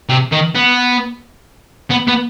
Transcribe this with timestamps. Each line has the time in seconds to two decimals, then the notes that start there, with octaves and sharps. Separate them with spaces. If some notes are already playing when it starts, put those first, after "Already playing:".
0.09 C3
0.32 D#3
0.55 B3
1.90 B3
2.07 B3